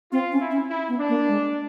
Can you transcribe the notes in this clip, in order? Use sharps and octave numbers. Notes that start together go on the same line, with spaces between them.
C4 F4
C#4
E4
C#4
E4
B3
D4
A#3
G#3